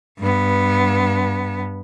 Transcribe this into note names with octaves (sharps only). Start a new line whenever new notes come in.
G2 B3